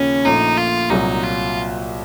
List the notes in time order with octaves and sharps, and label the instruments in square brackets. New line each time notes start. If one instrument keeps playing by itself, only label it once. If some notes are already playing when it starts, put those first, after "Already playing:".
Already playing: [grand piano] D#2 C#3 F3 A#3 [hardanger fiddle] C#4
[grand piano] A#1 A#2 A3 [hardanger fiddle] D#4
[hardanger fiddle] F4
[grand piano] C2 A#2 F#3 [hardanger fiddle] D#4
[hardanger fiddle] F4